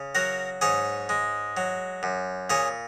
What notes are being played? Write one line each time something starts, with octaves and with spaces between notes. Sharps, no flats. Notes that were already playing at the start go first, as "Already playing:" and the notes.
Already playing: C#3
F#3 F#4 A#4
G#2 G#4 C#5
G#3
F#3
F#2
A#2 G#4 C#5